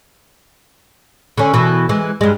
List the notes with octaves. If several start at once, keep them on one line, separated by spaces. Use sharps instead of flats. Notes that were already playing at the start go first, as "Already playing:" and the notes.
D3 C#4
B2 E3
E3 G#3
G2 G#3